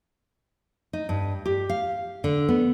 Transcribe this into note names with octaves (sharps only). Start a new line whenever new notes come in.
D#4
G2
G4
F5
D3
B3